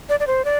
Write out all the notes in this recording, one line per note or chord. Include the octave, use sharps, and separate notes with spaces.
D5
D5
C5
D5